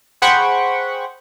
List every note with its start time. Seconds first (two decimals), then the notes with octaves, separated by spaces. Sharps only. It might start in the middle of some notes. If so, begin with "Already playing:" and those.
0.22 G#4 C5 F#5 G5 B5 C#6